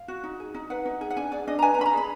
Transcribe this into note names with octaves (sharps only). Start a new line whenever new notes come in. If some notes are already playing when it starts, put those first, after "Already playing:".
Already playing: F5
F#4
D#4
G#4
D#4
B4 F#5
D#4
G#4
F#5
D4 G#5
G#4 D5
D4 D#5
A#5
B4 G#5
A#5
D4 B5
A#5
G#4 B5